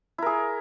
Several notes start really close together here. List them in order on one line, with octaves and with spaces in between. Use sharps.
E4 A#4 G#4